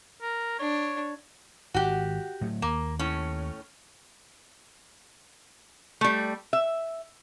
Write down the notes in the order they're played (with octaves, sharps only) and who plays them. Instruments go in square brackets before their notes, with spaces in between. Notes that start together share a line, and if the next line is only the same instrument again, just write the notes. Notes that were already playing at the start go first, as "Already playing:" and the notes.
[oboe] A#4
[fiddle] D4 [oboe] C#5
[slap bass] G#1 [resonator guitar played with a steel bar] F#4 G4
[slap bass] A2 F#3 A3
[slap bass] D#2 [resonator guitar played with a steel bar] A#3
[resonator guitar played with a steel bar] A2 C#4
G3 A3
E5